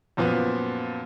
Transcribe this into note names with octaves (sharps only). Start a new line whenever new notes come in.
F#2 A#2 F3 B3